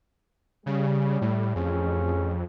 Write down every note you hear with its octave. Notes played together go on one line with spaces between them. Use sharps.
C#3 G3
A2
A1 F2 C#4 G#4